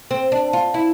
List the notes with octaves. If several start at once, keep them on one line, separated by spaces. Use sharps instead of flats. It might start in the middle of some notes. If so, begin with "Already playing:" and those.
C4
D4
F4
E4